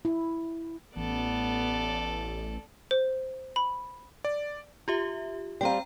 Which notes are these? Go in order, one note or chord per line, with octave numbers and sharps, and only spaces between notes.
E4
A1 B3 A4 D5
C5
B5
D5
F4 G4 E5
G3 C4 F5 G5 A#5